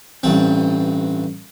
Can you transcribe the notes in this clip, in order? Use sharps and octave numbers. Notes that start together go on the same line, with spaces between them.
A1 G2 C4